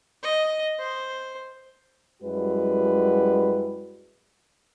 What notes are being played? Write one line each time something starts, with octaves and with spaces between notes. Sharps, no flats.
D#5
C5
F#2 G3 G#3 E4 F#4 B4